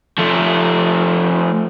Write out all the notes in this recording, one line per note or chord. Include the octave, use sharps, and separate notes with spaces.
F3 A3